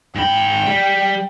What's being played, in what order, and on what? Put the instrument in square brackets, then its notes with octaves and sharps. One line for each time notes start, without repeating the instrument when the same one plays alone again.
[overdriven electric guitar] G#2 B5 [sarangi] G5
[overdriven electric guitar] G3